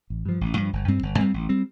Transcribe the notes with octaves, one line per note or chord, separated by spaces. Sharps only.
A1
G2 F3
A1
G2 F3
G1
G2 G3 C4
G1
G2 G3 C4
A1
G3 C4